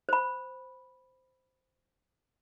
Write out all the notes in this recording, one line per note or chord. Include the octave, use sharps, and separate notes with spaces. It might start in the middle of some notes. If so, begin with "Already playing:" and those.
C5 B5